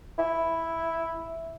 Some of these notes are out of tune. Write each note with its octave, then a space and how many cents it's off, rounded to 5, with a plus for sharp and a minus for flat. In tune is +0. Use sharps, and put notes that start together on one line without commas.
E4 +0